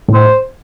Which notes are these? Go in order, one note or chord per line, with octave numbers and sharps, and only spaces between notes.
A2
C5